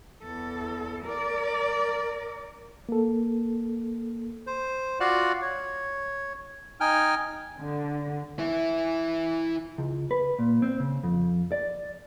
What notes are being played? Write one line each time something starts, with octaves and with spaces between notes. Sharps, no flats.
E2 A4
A#4 D5
A#3 A4
C5
F4 F#4 D5 F5 F#5
C#5
D#4 G5 G#5 F6
D3
E3 E4
C#2
B4
A#2
C4
C#3
F2
D5